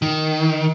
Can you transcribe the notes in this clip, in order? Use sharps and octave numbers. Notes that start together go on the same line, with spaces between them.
D#3